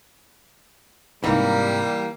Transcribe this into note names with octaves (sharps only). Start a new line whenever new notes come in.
G#2 C3 E3 G3 A#3 D#4